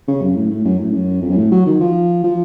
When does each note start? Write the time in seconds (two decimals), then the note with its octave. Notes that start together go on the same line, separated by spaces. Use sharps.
0.08 C#3
0.22 F#2
0.36 A2
0.51 A2
0.65 F#2
0.79 A2
0.93 F#2
1.22 F2
1.30 F#2
1.37 A2
1.51 F#3
1.66 D#3
1.80 F3
2.23 F3